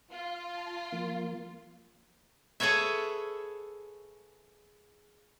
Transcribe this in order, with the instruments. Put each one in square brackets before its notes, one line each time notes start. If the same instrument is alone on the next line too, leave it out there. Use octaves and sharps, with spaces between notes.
[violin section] F4 [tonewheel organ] F5
[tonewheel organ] A5
F3 A#3
[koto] G#4 A4 B4 C#5 E5